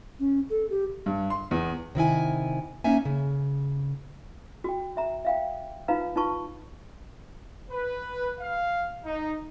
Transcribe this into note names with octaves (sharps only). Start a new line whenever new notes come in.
C#4
A4
G4
G2
C6
E2
C3 D#3 E4 G#5
A#3 C#4 D#4 E5 G#5
C#3
F#4 G5
F#4 E5 A#5
E5 F5 G5
D#4 F4 B4 F5 A#5
D#4 F4 B4 A5 C#6
B4
F5
D#4